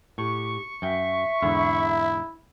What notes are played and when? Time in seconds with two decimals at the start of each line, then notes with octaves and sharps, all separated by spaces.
0.18 A2 G4 C#6
0.82 F#2 E5 G5
1.42 E2 G#2 D3 E4